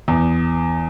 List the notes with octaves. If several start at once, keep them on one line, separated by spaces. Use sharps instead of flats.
E2